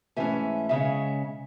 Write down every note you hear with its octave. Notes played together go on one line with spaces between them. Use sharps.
G#2 E3 A3 C#4 E5 G#5
C#3 G#3 C#4 E5 G#5